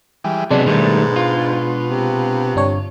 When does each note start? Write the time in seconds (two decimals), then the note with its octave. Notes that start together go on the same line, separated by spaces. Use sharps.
0.24 E3 G3 G#3
0.51 C3 F#3 G#3 B3 D4 C5 G#5
0.66 G#2 B2 D#3 G3 A3
1.16 F4
1.89 C3
2.56 G1 D4 C#5